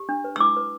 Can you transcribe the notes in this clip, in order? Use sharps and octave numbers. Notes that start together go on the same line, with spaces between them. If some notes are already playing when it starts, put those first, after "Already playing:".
Already playing: G4
D4
B4
E6
E4 D6
B4